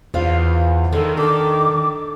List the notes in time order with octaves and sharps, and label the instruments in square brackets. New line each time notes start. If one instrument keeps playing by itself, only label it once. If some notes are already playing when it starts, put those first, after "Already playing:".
[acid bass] E2 [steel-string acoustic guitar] F4 C5 F5
[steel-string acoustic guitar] D3 G#4 [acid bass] D#3 [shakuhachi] A4
[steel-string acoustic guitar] D4 A4 [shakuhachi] D6